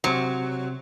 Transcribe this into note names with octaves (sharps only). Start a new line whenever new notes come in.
C3 F#3 C5